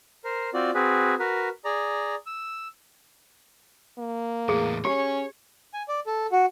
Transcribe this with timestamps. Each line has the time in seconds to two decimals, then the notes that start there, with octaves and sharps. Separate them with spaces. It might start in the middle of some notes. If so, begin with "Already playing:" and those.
0.25 A#4 C5
0.54 C4 F4 F#4 D5
0.75 C4 F#4 G#4 B4
1.19 F#4 A#4 B4
1.65 G#4 D5 A#5
2.26 E6
3.98 A#3
4.49 E2 A2 G#4
4.85 C#4 G4 C#5
5.74 G#5
5.88 D5
6.07 A4
6.32 F#4